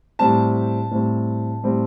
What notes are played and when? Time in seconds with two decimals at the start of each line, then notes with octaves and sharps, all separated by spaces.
0.19 A2 G3 C4 A5
0.91 A2 G3 C4
1.63 A2 G3 C4